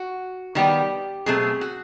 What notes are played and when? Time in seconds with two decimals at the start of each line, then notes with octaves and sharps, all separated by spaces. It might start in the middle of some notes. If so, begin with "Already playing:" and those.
Already playing: F#4
0.55 D#3 G3 B3 G4
1.26 B2 F#3 A3 C4 G#4
1.61 F#4